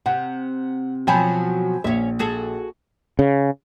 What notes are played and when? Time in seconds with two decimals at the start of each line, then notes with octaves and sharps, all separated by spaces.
0.06 C3 F#5
1.07 B2 F3 F#3 G5 G#5 B5
1.84 A#1 C#4 E5
2.19 F#4 G#4 A4
3.19 C#3